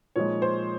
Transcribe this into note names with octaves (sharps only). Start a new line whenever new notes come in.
A#2 F3 G#3 D#4 C#5
C5